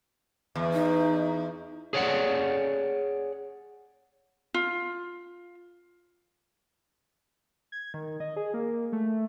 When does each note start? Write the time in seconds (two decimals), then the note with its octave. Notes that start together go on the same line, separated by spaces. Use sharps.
0.55 E2
0.73 D#4
1.93 G#4 C#5 D5 F#5
4.54 F4
7.72 G#6
7.94 D#3
8.20 D#5
8.36 G#4
8.54 A#3
8.92 A3